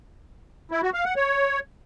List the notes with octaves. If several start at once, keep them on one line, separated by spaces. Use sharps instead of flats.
E4
F#4
F5
F#5
C#5